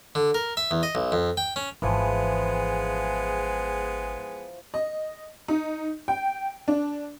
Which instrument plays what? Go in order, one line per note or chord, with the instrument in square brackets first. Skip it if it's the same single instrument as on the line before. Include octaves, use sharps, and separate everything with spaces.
[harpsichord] D3
A#4
E5
E2
D#5
B1
F2
G5
C#4
[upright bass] G#1 [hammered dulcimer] E3 F3 [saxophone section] G#3 B3 G#4
[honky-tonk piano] D#5
D#4
G5
D4